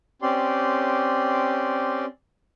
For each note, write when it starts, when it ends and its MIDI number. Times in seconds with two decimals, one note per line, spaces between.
0.22 2.05 60
0.22 2.05 61
0.22 2.05 67
0.22 2.05 74
0.22 2.05 84